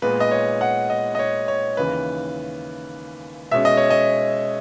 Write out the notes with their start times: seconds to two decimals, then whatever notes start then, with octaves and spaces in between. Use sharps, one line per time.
0.02 A#2 G#3 B3 B4
0.20 D#5
0.31 C#5
0.61 F#5
0.90 D#5
1.15 D#5
1.19 C#5
1.48 C#5
1.77 D#2 C#3 E3 B4
3.51 B2 G#3 C#4 E5
3.65 D#5
3.77 C#5
3.90 D#5